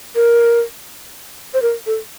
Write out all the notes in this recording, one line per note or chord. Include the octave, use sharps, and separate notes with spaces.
A#4
C5
A#4
A4